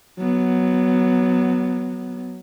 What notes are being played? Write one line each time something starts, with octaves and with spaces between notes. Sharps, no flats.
F#3 B3